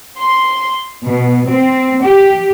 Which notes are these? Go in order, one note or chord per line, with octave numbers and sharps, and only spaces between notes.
C6
B2
C4
G4